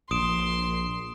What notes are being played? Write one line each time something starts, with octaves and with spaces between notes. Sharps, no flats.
A#1 C6 D#6 D7 E7